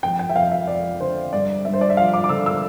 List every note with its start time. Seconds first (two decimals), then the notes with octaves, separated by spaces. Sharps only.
0.03 F2 G5
0.19 G5
0.30 E5
0.35 F2 F5
0.51 E5
0.68 F3 D5
1.00 D3 C5
1.33 G2 D5
1.65 G2 E5
1.73 C5
1.81 D5
1.90 E5
1.97 F3 F5
2.14 D6
2.24 D6
2.29 D3 E6
2.46 E6